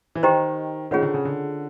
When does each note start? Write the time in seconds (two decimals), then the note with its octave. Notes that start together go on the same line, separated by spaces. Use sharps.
0.15 E3
0.23 D#3 G4 C5 D#5 G5 A#5
0.91 D#3 C#4 F4 G#4 C#5 F#5
1.02 D3
1.14 C#3
1.25 D3